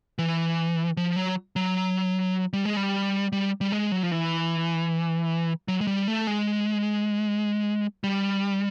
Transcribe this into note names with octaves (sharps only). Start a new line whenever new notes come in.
E3
F3
F#3
F#3
G3
G#3
G3
G3
G3
G#3
F#3
F3
E3
F#3
G#3
G3
A3
G#3
G3